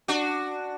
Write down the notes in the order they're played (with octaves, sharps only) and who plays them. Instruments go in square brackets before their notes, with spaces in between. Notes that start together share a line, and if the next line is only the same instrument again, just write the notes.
[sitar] D4 F#4